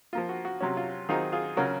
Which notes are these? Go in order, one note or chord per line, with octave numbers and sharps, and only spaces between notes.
F3 A#3 F4
F#4
F#4
C3 F#3 C#4
F4
D#3 F#3 C4 D#4 F4 G#4
F4 G#4
C#3 F#3 C#4 F4 F#4 A#4